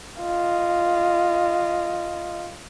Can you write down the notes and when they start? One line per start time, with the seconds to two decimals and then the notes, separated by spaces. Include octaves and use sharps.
0.20 F4 D#5